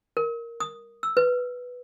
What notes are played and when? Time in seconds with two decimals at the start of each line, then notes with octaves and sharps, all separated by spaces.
0.17 A#4
0.60 D#6
1.03 E6
1.17 B4